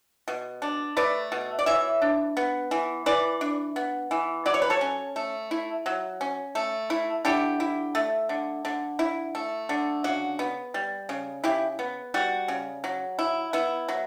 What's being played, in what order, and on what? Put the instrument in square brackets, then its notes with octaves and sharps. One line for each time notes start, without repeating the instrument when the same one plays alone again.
[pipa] B2
D4
A3 B4 D5
B2
D5
E3 C#5 E5
D4
B3
E3
E3 B4 D5
D4
B3
E3
F#3 D5
C#5
B4
A4 C#5
C#4
A3
E4
F#3
C#4
A3
E4
D3 E4 G4
E4
A3
D3
D3
E4
A3
D3
C#3 F#4
B3
G3
C#3
C#3 E4 G4
B3
G3 F#4
C#3
F#3
E4
B3 E4
F#3